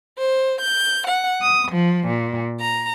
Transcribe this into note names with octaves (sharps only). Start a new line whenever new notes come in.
C5
G6
F#5
D#6
F3
A#2
A#5